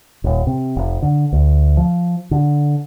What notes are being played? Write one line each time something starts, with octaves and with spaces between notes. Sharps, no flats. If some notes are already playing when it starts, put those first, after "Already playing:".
D#1
C3
F1
D3
D2
F3
D3